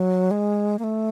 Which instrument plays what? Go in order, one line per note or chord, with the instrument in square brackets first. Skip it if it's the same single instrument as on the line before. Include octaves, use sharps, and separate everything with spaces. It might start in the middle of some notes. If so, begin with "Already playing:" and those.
Already playing: [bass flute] F#3
G#3
A#3
A3